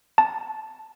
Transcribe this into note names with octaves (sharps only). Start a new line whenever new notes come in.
A5